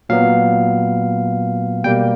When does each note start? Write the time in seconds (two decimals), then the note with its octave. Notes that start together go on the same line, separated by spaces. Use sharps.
0.09 A#2 F#3 B3 F5
1.84 B2 G3 A#3 G5